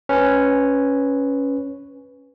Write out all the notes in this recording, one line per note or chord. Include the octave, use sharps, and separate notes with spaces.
C#4 B4 G#5